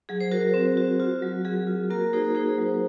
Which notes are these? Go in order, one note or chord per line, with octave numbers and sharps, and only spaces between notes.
F#3 G#4
C5
F#4 A#4
C4
F#4
F4 F#4
F#3
F#3 G#4
F4
A#3 F#4 A#4
D#4 G#4 C5
D#4 G#4 C5
F#3